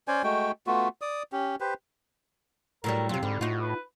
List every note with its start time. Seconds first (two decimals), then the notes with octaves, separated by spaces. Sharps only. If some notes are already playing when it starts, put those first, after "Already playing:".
0.08 C#4 C5 D5 G#5
0.24 G#3 A3 F#4 G5
0.67 A3 B3 F4 F#4
1.01 D5 D#6
1.32 C#4 G4
1.60 G4 B4 C5
2.84 A2 F#3 G3 A#4
3.09 F2 C3 F#3 F4
3.23 G#2 D3 G3
3.41 A2 D#4 F4 F#4
3.61 B4